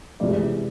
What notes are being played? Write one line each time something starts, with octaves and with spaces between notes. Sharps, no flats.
C3 E3 G#3 D5